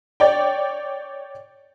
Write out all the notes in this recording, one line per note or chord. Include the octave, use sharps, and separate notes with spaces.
C#5 D5 G5